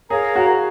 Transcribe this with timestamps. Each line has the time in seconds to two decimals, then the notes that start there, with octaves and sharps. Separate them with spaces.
0.10 G#4 A#4 C#5 F5 A#5
0.35 F#4